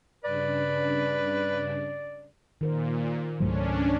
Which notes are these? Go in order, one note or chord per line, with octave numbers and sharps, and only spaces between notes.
G2 C#3 D4 B4 D5
A#2 D#3 A#4 C5
C#2 G#2 F#3 A3 C#4 D4 C5